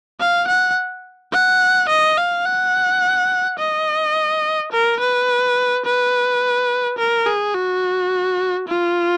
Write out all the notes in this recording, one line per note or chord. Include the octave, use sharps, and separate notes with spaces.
F5
F#5
F#5
D#5
F5
F#5
D#5
A#4
B4
B4
A#4
G#4
F#4
F4